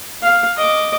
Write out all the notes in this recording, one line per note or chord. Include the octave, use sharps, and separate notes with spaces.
F5
D#5 D6